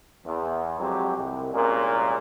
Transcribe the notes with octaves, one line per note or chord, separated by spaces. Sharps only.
E2
F2 F#3 G#3 C4 G4
C2
C2 A#2 G#3 C#4 G#4 A#4